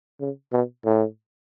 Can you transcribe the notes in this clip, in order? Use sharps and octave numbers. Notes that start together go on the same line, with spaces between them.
C#3
B2
A2